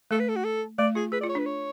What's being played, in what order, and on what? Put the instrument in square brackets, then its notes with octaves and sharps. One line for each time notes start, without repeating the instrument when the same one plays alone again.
[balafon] A3 [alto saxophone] A4
[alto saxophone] B4
A4
F#4
A4
[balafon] A3 [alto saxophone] D5
[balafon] F4 [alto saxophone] G#4
[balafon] G#4 [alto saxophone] B4
[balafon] F4 [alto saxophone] D5
[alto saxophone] C#5
[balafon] D4 [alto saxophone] B4
[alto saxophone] C#5